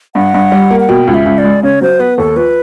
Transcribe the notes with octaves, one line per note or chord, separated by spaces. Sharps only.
G2 F#5
G2
G3
A#3
F#5
B2 G5
C#2
E5
C#2
D5
G#3
C#3 C#5
F#3 C5
B3 B4
D#2 A4
F3 B4